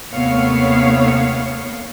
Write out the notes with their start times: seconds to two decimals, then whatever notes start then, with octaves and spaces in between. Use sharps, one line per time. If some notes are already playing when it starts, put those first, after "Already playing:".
0.14 D#2 C3 A3 B3 C#5 F5